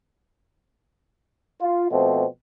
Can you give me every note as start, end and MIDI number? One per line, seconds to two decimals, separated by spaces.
1.61 1.88 65
1.91 2.26 47
1.91 2.26 53
1.91 2.26 57
1.91 2.26 60